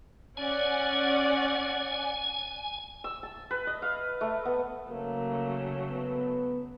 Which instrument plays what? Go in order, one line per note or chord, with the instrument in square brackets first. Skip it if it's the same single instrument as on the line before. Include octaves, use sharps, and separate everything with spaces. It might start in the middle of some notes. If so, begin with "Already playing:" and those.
[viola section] C#4 D5 F#5 [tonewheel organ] G#5
[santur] E6
A5
B4
D#5
F5
A3
B3
[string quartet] C#3 F#3 A3 [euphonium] A#3
[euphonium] B3